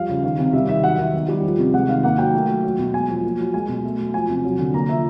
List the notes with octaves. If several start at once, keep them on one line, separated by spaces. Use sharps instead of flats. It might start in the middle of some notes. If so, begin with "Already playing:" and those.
Already playing: F3 G3 F5
C#3
D#3 F5
C3
G3 E5
D#3 E5
F#3 F#5
D#3
B3
G3
F3
C3
G#3 F#5
D#3 F5
A#3 F#5
F#3 G5
A3
F#3
F#3
B2
G#3 G#5
F3
A#3
F#3
G#3 G#5
B2
A3
F#3
F3 G#5
C3
F#3
D3
A#3 A#5
F3 E5